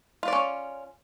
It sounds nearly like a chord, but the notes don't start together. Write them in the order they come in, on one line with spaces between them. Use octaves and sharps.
F4 D5 C#4